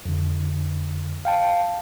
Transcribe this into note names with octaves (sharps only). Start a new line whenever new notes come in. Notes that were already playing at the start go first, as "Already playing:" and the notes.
F2 D3
F5 G5 A5